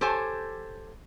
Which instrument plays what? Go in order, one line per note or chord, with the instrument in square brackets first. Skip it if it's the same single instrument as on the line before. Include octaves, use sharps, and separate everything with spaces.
[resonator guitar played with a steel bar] G4 A4 C5 C#5 G#5